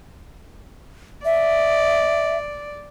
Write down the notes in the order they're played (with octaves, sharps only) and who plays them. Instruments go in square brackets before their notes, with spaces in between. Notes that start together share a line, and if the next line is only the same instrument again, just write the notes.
[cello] D5 [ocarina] E5